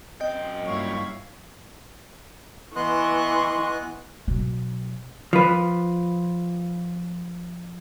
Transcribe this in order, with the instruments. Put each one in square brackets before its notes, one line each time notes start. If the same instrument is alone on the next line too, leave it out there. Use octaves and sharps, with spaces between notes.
[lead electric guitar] F#2 G5 [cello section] C4 [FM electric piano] D#5
[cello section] G2 A#2 F5 [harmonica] E4 C#5 C#6
[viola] E3 C#6 [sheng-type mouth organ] B3 D#5 F#6 [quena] C6
[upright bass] B2 F#3
[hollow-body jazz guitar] F3 B4